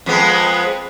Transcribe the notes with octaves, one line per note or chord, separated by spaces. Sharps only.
F2 G#3 B3